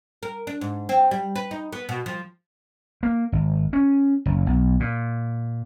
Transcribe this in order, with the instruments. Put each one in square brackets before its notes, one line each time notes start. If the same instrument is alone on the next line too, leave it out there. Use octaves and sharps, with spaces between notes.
[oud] A#4
D4
G#2
C4
G3
B4
D#4
B3
B2
F3
[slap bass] A#3
G#1
C#4
F#1
B1
A#2